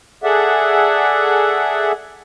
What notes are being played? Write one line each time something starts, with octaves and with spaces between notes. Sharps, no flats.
G#4 A4 D5 E5 F#5